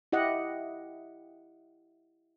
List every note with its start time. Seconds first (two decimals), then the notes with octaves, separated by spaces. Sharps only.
0.12 E4 G4 D#5 F#5